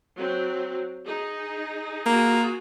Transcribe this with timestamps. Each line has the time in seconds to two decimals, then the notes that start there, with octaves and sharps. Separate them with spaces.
0.16 F#3 C4
1.05 D#4 G#4
2.06 A#3 F4 F#4 G#4